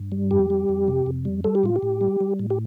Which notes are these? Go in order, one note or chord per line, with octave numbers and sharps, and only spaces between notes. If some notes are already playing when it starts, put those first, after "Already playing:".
Already playing: G2
G3
F2 G4
G3
F2
C3
F2
G3
G3 A4
G4
A2 F4
G4
A2
G3
G3
A2
G4